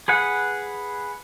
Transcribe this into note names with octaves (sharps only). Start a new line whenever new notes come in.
G#4 B4 F#5